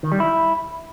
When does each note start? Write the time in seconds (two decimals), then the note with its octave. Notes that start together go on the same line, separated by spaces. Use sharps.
0.03 D#3
0.12 G3
0.20 E4